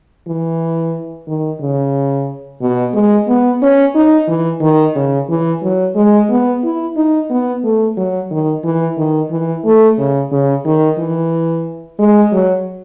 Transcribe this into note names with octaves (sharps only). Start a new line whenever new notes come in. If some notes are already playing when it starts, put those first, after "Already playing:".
E3
D#3
C#3
B2
G#3
B3
C#4
D#4
E3
D#3
C#3
E3
F#3
G#3
B3
E4
D#4
B3
A3
F#3
D#3
E3
D#3
E3
A3
C#3
C#3
D#3
E3
G#3
F#3